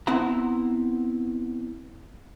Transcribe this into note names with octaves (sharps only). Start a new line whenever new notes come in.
B3 C4 E4 E5 F#5 A#5